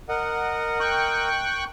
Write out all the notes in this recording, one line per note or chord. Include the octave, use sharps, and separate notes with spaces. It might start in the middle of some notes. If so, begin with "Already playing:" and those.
A#4 D#5 F#5
G5 C#6 F#6